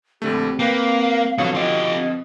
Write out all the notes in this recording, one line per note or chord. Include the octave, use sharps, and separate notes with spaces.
A#1 D3 A3 C4 G4
A#3 B4 F5 G5
B2 D3 F3 F#3 C#5
F4 G4 D#5
C4